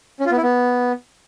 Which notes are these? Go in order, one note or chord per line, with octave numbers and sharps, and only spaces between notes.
C#4
F4
B3
E4
B3